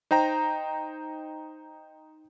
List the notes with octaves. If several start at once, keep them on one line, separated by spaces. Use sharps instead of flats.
D#4 C5 G5 A#5